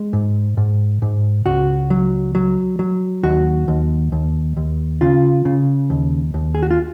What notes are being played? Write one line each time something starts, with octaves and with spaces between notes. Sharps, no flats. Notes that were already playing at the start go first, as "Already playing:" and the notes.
Already playing: G#3
G#2
G#2
G#2
C#2 F#4
F#3
F#3
F#3
D#2 F#4
D#2
D#2
D#2
C#3 F4
C#3
D#2
D#2
G#4
F#4
F4